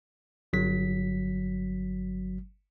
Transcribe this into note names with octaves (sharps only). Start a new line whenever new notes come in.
G1 F#3 B6